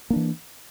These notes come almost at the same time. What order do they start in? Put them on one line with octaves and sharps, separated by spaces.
A#3 D4 E3